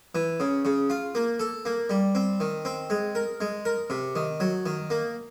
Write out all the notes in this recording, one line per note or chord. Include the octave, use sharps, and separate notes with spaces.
E3
C#3
C#3
F4
A#3
A4
A#3
G3
C4
D#3
C4
G#3
A#4
G#3
A#4
C3
D#3
F#3
D#3
A#3